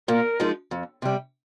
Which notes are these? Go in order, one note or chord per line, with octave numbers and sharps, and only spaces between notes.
A#2 A#4
F3 G#3 D#4
F2
C3 G3